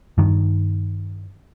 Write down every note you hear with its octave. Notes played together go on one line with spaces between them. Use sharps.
G2 D#3